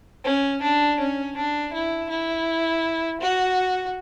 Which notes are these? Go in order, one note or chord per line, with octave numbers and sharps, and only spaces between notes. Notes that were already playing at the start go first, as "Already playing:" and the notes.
C#4
D4
C#4
D4
E4
E4
F#4